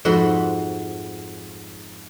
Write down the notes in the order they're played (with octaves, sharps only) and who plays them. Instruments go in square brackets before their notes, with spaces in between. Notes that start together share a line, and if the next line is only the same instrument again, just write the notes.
[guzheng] F2 G#2 F#4 E5 B5 C6